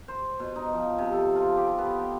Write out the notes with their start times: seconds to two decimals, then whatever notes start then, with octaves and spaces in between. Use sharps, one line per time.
0.08 C5
0.40 B2
0.56 D#4
0.73 F3
0.98 C3
1.13 A4
1.36 F4
1.57 G4
1.79 B3
1.99 G5